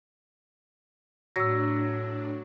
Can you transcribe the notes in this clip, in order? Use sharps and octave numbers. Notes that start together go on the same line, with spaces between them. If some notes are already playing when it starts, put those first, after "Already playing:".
A2 F#3 D4 E6 A#6